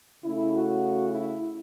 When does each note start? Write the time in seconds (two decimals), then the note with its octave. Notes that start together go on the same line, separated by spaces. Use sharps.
0.24 C#3 A3 C#4 E4
0.53 F#4
1.09 E4